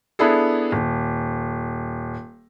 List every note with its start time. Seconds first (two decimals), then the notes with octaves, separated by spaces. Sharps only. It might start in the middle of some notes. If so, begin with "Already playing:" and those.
0.19 B3 D4 E4 G#4 A4
0.72 D#1